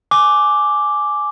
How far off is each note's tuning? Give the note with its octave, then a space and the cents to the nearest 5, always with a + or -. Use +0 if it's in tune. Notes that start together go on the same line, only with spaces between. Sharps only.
G#5 +15 D6 +0